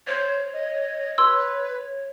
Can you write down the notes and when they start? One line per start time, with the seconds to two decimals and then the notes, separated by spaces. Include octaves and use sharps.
0.07 C5 C#5
0.53 D#5
1.18 B4 C6 E6